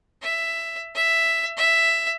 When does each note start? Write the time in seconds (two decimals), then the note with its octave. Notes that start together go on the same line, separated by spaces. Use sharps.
0.22 E5
0.95 E5
1.57 E5